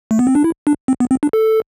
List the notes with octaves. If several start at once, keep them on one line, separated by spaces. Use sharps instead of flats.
A3
B3
C4
D4
E4
D4
C4
B3
C4
D4
A4